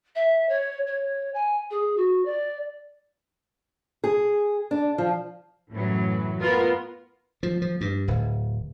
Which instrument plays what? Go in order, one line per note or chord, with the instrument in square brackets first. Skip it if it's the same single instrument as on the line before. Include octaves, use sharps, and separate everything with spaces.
[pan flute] E5
C#5
C#5
G#5
G#4
F#4
D5
[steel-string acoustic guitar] G#4
D4
F3
[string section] F#2 A2 E3 F#3
B3 F4 A#4 B4
[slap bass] F3
F3
G2
D1